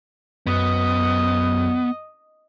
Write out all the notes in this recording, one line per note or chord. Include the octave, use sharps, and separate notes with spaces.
F#2 B3 D#5